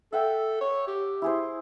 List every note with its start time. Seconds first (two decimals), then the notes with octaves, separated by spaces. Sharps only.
0.13 A4 E5 F#5 G5
0.61 C#5
0.88 G4
1.22 E4 G#4 C5